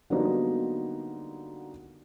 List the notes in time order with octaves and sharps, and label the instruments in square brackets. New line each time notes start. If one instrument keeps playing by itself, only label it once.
[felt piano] D3 F#3 G3 A#3 B3 D#4